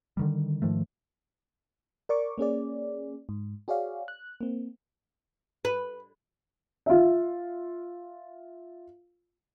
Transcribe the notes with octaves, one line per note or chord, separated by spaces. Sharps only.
D3 D#3 G3
G#2 D#3 F3 A3
A#4 D5 C#6 D6
A#3 C#4 G#4 D5
G#2
F#4 G#4 C#5 D5 F5
F#6
A#3 C4
B4
F4 E5